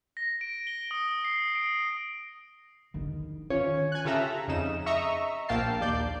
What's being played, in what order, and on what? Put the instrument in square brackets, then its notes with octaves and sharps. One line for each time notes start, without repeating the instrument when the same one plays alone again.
[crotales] A#6
D7
G7
D#6
C7
D7
[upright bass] E2 D#3
[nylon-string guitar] C#4 F4 C#5
[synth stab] G#5 F#6
C#3 F4 G4 A4 E5 A#5
F2 C#3 D#4 E7
D#5 E5 A#5 C#6 E6
A#1 A#3 F5 G5 A5 C7
D#2 D5 G6